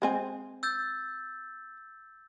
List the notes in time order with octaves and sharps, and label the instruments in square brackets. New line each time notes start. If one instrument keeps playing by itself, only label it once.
[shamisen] G#3 C4 G#5
[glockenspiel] E6 G6 A6